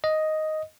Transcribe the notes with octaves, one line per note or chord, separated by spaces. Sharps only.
D#5